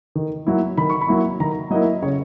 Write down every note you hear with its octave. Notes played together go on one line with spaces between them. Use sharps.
D#3
F#3 A#3 E4
D#3 B5
C#6
B5
F#3 A#3 E4
D#3 A#5
F#3 A#3 E4 D#5
C#3 C#5